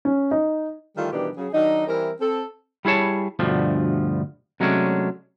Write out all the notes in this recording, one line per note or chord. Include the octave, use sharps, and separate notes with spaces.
C#4
D#4
D#3 E3 G3 A3 F4 A4
B2 D#3 E3 G3 D4 G4
C#3 F#3 G#4
D#3 F#3 D4 D#4
E3 G3 C4 E4 A#4
C4 A4
G3 E4 G#4 C#5 A5
D2 G2 B2 F3 A3 D4
C3 F#3 G#3 A3 C#4 D4